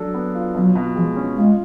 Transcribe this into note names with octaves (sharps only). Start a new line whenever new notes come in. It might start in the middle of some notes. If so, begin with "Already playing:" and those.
Already playing: F#3 D4 A4
B3
F4
B2 F#3
B2
F3 G#3
C#4
G#3 F4